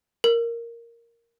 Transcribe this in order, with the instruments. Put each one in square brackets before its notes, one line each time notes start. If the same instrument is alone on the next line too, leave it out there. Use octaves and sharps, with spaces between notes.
[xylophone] A#4